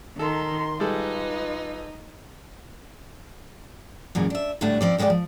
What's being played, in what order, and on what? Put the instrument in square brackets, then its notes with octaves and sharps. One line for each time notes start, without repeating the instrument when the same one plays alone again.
[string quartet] D#3 [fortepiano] A4 [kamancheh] A#4 C6
[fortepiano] G3 G#3 A4 [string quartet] D#4 [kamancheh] F4 B4
[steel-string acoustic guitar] F#2 A#2 E3 G#3
D4 E5
A2 D3 G3 A3 D4 F#4
F3 C4 D5
E2 G#3 B3 F#4 D5 G5
F3